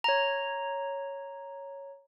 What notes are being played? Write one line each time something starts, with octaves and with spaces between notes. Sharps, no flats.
C#5 A#5